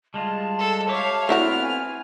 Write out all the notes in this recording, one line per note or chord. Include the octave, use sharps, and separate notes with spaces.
G3 G#3 F4 A5
A4
G4 C#5 E5 F5 D6
A3 B3 C4 E4 F#4 G5 F6
G#5